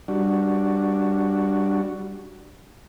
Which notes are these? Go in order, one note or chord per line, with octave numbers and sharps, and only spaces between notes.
G3 D4 F#4